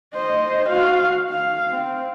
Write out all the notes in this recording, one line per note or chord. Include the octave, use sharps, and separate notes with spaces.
C5 D#5
F#4 F5
F5
C4